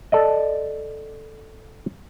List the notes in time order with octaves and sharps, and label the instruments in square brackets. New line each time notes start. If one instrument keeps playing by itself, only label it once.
[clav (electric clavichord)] A4 D5 D#5